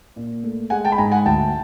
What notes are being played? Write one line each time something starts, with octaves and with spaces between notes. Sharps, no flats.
A#2
A3
G#3 F#5 G#5
G5 A5
B5
G#2 G#5 A#5
F#5 G#5
D2 G5 A5